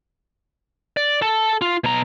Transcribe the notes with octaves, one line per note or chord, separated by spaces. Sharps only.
D5
A4 A5
F4
B2 A#5